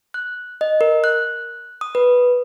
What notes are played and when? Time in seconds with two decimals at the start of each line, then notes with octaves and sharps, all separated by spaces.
0.14 F#6
0.61 D#5
0.81 A#4
1.04 F#6
1.81 D#6
1.95 B4